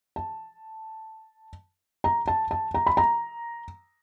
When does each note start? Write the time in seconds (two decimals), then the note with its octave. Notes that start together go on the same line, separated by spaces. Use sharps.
0.16 A5
2.04 A#5
2.28 A5
2.51 A5
2.74 A#5
2.87 B5
2.97 A#5